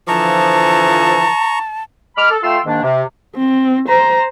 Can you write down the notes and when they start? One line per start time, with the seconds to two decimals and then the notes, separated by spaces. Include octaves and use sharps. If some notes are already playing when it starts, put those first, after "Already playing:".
0.08 D3 E3 F3 A5 A#5 C#6
2.17 G#3 B5 D6 F6
2.31 A4
2.43 A3 F4 F5 G5 C6 E6
2.66 G#2 D#3 A#3 D4
2.83 C3
3.36 C4
3.89 C5 A#5